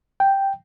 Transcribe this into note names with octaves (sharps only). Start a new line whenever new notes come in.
G5